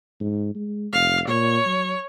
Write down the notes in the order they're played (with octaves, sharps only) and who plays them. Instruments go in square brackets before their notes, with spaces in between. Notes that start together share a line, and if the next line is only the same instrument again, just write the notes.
[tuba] G#2
G#3
[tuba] F1 [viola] F5
[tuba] A#2 [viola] C#5
[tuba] F#3